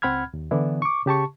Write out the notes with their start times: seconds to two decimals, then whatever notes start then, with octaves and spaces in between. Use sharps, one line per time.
0.02 C#2 C4 F#5 B5 F6 G#6
0.34 D#2
0.51 D3 E3 B3 D4 E4
0.82 C#6 D6
1.06 C#3 G4 A5 C#6